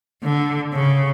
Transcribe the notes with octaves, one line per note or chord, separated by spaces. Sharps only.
D3
C#3